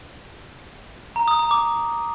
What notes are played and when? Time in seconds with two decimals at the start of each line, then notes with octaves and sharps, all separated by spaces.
1.16 A#5
1.28 D#6
1.39 A#5
1.51 D6